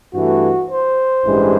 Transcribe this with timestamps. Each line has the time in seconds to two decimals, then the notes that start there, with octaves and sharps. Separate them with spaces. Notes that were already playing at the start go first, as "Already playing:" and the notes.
0.13 G2 E3 A3 F#4
0.69 C5
1.25 A1 G2 E3 G#3